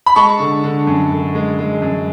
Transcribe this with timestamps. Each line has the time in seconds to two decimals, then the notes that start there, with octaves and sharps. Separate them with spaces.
0.06 B5
0.16 G#3 A5 C#6
0.40 D3
0.64 D3
0.87 F#2
1.11 D3
1.35 G#3
1.59 G#3
1.82 F#2